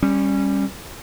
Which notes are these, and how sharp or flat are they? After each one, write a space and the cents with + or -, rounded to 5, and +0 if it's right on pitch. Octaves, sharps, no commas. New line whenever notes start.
G3 +10 C#4 -15